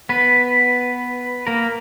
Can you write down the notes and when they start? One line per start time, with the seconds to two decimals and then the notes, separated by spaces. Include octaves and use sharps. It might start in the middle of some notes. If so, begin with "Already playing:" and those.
0.09 B3 B4
1.47 A#3 A#4